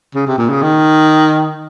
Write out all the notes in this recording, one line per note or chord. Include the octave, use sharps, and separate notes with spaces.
C#3
C3
A#2
C#3
D#3